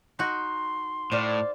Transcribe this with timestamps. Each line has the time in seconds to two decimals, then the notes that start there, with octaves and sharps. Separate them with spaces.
0.19 D#4 F#4 C6
1.12 A2 C5 D5 F5